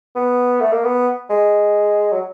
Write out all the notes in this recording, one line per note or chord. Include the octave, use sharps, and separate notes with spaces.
B3
A3
A#3
B3
G#3
F#3